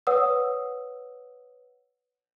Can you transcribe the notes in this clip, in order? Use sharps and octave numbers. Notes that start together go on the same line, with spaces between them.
B4 C#5 F#5 D#6 E6